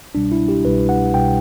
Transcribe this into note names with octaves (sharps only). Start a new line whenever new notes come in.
C2 B2 G3 D4
E4
G4
C2 B2 G3 B4
F#5
C2 B2 G3 G5